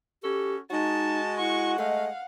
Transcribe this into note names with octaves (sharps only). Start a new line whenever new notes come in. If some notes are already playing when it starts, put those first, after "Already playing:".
C#4 F#4 G4 A4
G#3 D#4 F#4 A5
E4 F#5 C#6
G#3 A3 D#5 F5